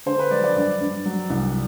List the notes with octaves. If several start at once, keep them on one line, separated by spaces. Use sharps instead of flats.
D3 C5
B4
F#3 D5
D5
G2 D5
G2
F#3
C2